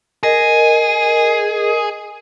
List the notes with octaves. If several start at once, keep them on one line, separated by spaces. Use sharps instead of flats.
G#4 A#4 D#5